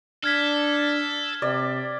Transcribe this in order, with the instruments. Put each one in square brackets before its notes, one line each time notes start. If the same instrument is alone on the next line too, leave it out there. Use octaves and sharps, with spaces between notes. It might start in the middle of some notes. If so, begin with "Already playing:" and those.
[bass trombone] D4 [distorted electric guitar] A4 [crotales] F6 G#6 B6
[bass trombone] C3 [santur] D5